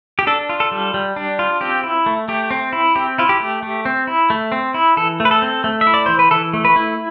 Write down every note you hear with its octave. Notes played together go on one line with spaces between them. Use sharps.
G4
D4 A4
F4
A4
G3
G3
D4
F4
C4 G4
E4
A3
A3 G4
C4
E4
C4 G4
E4 F4
G4
A3
A3
C4
E4
A3
C4
E4
E3 A4
A3
B4
A4
C4
A3
E5
E4
D5
E3 C5
B4
E3 A4
A3
B4
E4